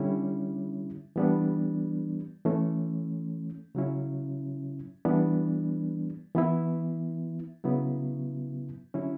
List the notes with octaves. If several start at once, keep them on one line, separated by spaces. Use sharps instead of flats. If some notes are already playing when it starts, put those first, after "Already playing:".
Already playing: D3 G3 C#4 E4
E3 G3 B3 D4
E3 A3 C#4
C#3 F#3 C#4 E4
E3 G3 B3 D4
E3 B3 E4
C#3 F#3 B3 E4
D3 F#3 C#4 E4